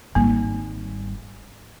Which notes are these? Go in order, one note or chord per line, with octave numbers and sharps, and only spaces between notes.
G#1 G3 A#3